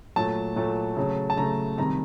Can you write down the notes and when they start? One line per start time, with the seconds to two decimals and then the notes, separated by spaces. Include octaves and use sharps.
0.16 A#2 F#3 A3 A5
0.56 A#2 F#3 A3
0.97 C#3 F#3 A3
1.30 A5
1.37 C#3 F#3 A3 A#5
1.78 C3 D#3 G3 A#5